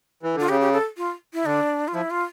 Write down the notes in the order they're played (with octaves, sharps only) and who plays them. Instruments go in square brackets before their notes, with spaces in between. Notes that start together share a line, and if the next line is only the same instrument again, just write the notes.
[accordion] E3
[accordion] D3 [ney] F4
[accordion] C#3 [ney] G4
[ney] G4
A4
F4
E4
[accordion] D3 [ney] D4
[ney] F4
[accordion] F3 [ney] E4
[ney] F4